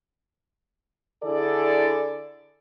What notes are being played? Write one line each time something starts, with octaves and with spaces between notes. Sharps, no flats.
D3 E4 G#4 A4 D5